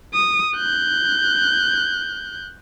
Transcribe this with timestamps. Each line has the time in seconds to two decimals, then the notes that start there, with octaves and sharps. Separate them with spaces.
0.14 D#6
0.56 F#6 G6